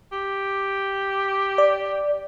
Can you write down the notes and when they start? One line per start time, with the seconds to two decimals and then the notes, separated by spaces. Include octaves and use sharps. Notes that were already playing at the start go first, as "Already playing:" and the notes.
0.12 G4
1.58 D5